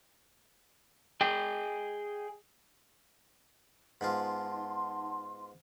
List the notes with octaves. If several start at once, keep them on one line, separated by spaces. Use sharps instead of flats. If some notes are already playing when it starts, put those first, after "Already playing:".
G#4 D#5 G5
G#2 B3 D#4 F4 F#5 A5 C6